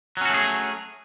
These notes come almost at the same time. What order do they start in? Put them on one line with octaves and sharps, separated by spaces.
F#3 C#4 F#4 A3 G#4